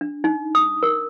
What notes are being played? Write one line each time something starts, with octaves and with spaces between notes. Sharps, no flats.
D4
D#4
D#6
A#4